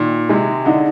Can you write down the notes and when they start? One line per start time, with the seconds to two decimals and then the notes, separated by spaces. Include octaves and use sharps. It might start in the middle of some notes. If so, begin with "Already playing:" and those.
Already playing: A#2 D#3
0.29 C3 G#3
0.65 D3 D#4